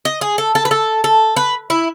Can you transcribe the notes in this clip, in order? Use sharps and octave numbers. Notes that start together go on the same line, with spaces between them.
D#5
G#4
A4
A4
B4
A4
A4
B4
E4